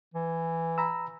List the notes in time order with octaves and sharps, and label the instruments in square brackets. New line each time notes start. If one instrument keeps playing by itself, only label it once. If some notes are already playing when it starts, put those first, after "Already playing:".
[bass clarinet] E3
[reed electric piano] A#5 B5 E6